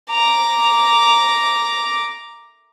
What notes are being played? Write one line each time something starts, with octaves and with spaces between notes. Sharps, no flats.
A#5 D6